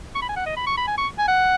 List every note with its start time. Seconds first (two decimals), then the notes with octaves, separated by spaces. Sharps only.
0.15 C#6
0.22 B5
0.29 G#5
0.36 F#5
0.46 D#5
0.56 B5
0.67 C#6
0.77 B5
0.87 G#5
0.98 C#6
1.18 G#5
1.28 F#5